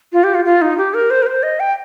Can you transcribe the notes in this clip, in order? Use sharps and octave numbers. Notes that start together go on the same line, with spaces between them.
F4
G4
F4
F4
D#4
G4
A#4
C5
A#4
C5
D#5
G5